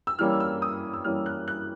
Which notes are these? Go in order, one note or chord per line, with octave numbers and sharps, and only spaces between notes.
E6
E3 G3 A#3 C#4 F6
E6
D#6
E6
E3 G3 A#3 C#4 F6
F#6
F#6